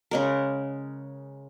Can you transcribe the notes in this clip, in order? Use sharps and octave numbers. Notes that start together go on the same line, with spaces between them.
C#3 G#3 A#4